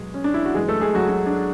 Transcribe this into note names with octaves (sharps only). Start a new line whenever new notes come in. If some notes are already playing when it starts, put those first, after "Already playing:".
Already playing: B2 F#3 G#3 G#4
C#4
D4
E4
F#4
F#2 E3 G#3 G#4
A3 A4
G#3 G#4
F#3 F#4
F#3 F#4
D4